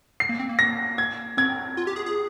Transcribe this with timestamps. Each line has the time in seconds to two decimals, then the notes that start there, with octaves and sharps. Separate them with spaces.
0.20 C7
0.29 A#3
0.39 C4
0.49 A#3
0.59 A#6
0.98 G#6
1.37 C4 G#6
1.77 F4
1.87 G4
1.96 G#4
2.06 G#4